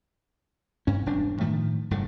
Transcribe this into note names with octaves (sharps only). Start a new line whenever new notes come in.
G2 C#4
E1 G2 D4
A2 D#3 F3 A3
F1 G2 A#2 D3